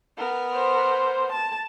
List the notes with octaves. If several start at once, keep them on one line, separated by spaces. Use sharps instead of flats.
B3 A#4
C5
A5